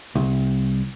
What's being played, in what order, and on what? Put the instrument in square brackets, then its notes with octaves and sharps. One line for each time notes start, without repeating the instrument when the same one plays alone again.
[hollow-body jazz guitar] C2